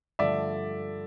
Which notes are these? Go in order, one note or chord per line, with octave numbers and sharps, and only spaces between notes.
G2 D3 F3 A3 D5 E5